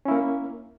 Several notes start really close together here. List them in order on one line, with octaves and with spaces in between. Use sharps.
C#4 E4 A#3